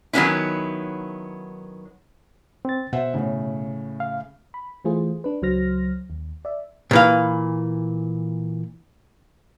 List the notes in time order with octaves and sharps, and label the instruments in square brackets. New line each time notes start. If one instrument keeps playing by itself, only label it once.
[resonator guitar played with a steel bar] D#3 F#3 A3 B3 C#4 E4
[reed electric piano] C4 A6
[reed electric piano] B2 [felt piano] C5 E5 F#5
[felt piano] A2 C#3
[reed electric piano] F5
[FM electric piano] B5
E3 A3 F4 G#4 C5
D4 B4
C#2 F#3 C5 F6 A#6
D#2
D5 E5
[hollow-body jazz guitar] A#2 E3 F5